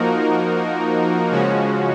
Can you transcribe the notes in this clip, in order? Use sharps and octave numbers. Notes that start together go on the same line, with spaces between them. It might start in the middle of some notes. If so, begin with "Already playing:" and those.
Already playing: F3 A#3 D#4 F#4 A#4
C#3 F3 G#3 C#4 F#4